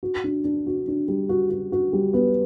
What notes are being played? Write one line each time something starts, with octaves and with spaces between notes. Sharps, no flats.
F#4
D4
D4
F#4
D4
G3
F#4
F#4
F#4
G3
B3